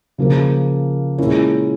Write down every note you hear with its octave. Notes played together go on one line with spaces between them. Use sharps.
C#3 F3 A#3 F4 A#4
A#2 G#3 C#4 E4 A#4